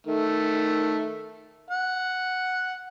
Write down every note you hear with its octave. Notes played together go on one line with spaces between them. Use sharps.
D#3 A3
F#5